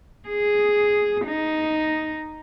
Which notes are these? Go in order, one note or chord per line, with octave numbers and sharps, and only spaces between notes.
G#4
D#4